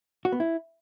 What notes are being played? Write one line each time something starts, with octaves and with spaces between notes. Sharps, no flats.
F#4
B3
E4